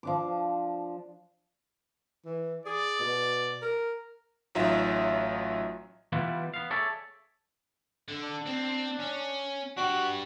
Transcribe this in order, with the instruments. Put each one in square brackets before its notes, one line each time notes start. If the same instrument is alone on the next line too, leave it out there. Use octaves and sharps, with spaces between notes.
[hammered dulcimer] F3 D4 D6
[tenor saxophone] E3
[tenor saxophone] G#4 [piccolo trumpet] D5
[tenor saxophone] B2
A#4
[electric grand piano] A1 F#3 D#4 F4 E5
[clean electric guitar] E3 G3 B3 E4 F4 B4
B3 F5
G#4 A4 C#5 D5 E5 A5
[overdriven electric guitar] D3
[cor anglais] D4
[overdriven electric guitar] C4
C#4
[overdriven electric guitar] D4 G4 [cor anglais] F#4